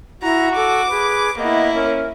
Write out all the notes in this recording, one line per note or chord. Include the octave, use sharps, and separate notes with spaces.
E4 F#4 A#5
A4 D6
G#4 B4
A#3 B3 E4 D#5
C#4 A#4